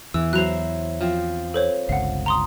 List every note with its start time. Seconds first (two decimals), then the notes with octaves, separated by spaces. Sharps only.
0.14 E2 E3 E6
0.33 F#3 E4 C5 F#6 F7
1.01 F3 C4
1.54 A4 C5 C#5
1.89 G1 C#2 F5 F#5
2.26 A#5 C6 D#6